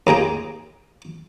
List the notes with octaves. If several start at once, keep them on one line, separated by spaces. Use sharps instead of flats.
D#2 A#3 G#4 G5